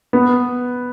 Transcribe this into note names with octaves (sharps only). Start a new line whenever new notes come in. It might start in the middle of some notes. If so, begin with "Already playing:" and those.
B3